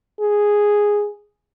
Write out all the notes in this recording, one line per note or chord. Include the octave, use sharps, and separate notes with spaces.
G#4